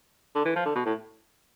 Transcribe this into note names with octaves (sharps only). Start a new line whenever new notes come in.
D3
E3
F3
D3
B2
A2